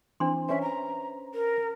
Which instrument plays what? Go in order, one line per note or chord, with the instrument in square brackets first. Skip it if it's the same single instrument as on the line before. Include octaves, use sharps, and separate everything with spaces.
[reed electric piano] E3 C4 C5 [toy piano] D4 C6
[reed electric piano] C#4 B4 C5 [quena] E5
[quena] A#5
A#4